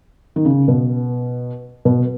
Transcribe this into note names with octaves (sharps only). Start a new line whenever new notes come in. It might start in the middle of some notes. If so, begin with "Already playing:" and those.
D#3
C#3
B2
B2